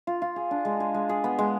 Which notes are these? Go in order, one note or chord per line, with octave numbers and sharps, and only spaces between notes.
F4
F4
G#4
D4
G#3
G#4
G#3
G#4
B3
G#3